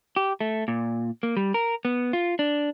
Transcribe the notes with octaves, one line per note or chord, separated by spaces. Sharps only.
G4
A3
A#2
A#3
G3
A#4
B3
F4
D4